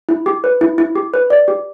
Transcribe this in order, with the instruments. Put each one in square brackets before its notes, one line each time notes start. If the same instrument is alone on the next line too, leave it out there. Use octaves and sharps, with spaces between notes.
[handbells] E4
G4
B4
E4
E4
G4
B4
D5
G4